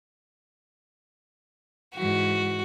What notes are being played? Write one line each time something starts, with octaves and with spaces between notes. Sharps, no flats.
G#2 E3 F#4